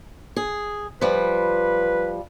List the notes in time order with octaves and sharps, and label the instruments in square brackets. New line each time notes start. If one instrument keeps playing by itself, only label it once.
[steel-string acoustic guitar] G#4
[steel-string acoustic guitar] F3 G3 [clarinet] B4